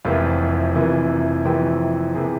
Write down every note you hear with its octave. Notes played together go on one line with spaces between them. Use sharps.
F1 F2 C3 E3 A#3 F4
F1 F2 C3 E3 A#3
F1 F2 C3 E3 A#3 G4
C3 E3 A#3 G#4